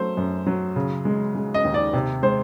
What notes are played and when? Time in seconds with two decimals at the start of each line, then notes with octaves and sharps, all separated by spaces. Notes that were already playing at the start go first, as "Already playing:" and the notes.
Already playing: F#3 A3 C5
0.17 F#2
0.46 F#3
0.76 C#3
1.05 G#3
1.35 G#3
1.54 D#5
1.65 D#2
1.74 D5
1.93 C3
2.23 G#3 C5